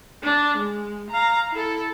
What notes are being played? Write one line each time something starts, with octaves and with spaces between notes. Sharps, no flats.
D4
G#3
F5 A#5
E4 A4